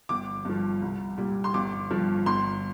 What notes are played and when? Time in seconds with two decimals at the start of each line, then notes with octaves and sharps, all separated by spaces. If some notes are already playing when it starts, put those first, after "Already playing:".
0.09 G1 D6
0.45 G2 F3
0.82 C2
1.18 A#2 G3
1.44 C6
1.54 G1 D6
1.91 G2 F3
2.26 G1 C6